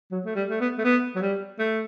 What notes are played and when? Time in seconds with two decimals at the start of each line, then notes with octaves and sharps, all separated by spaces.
0.11 F#3
0.26 A3
0.35 G3
0.50 A3
0.61 B3
0.78 A3
0.85 B3
1.16 F#3
1.22 G3
1.59 A3